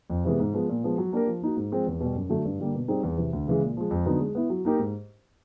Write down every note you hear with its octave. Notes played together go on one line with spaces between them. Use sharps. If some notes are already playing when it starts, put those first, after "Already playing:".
F2
C3 E3 G#3 B3
G#2
F3 G#3 B3
A#2
F3 G#3 B3
F#3
A#3 D4 G4 A#4
F3
A#3 D#4 F#4
G#2
F3 G#3 C4
E2
B2 G3
F#2
D3 F#3 A3
G2
D3 G3 A#3
B2
G3 C4 D#4 G#4
E2
C3 E3
D2
C#3 E3 G#3
A#2
F3 G#3
F2
D3 F#3 B3 D#4
G#3
B3 E4
F#3
A#3 D#4 G4 A#4
G#2